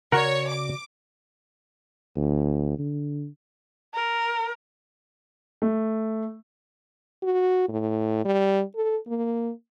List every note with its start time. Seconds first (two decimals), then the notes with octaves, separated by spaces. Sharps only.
0.12 C#3 F#4 A#4 C#5 D5 F#5
0.49 D6
2.16 D2
2.79 D3
3.94 A#4
5.62 A3
7.23 F#4
7.69 A2
8.25 G3
8.76 A4
9.07 A#3